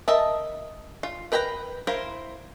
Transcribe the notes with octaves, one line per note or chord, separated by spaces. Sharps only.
A#4 D#5 E5 A5
F4
A#4 B4 G5 G#5 A#5
E4 A#4 C5 F5